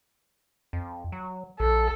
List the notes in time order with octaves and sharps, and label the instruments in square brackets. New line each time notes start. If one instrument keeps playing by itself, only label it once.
[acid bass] F2
F#3
[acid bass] A#1 [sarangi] A4